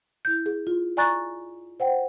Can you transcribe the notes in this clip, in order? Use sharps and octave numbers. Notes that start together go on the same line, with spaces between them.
E4 G6
G#4
F4
D5 G#5 A#5 C#6 F#6 A6
C5 F#5 G5